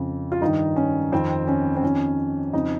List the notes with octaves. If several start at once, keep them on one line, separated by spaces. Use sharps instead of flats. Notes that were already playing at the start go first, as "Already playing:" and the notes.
Already playing: F2 C#3
F4
G2 D#3 D#4
C#4
F2 D#3 C4
C#4
C4
F2 D#3 C#4
F2 C#3 D#4